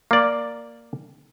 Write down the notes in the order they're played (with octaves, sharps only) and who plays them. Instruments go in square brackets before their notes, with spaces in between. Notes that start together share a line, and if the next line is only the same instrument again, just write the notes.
[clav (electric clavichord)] A#3 D5